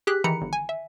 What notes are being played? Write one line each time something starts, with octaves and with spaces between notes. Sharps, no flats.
G4 G#4 F#6 B6
D#3 E3 A#5 B5 C#7
G1
G#5
E5